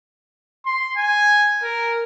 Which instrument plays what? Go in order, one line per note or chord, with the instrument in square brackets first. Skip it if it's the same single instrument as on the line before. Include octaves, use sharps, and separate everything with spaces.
[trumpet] C6
G#5
A#4